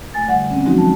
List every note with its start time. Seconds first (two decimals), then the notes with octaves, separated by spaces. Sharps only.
0.14 F2 A3 G#5 A6
0.28 D3 G3 F#5 G#5
0.50 C4 C#4
0.65 F3 F#3 G#3 C4 D#4 F#4
0.78 A5